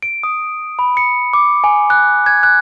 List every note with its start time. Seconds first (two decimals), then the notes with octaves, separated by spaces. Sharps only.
0.03 D7
0.23 D#6
0.79 B5
0.97 C#7
1.33 D6
1.64 G#5
1.90 F#6
2.26 G#6
2.43 F#6